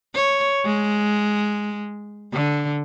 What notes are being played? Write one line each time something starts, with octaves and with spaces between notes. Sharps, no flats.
C#5
G#3
D3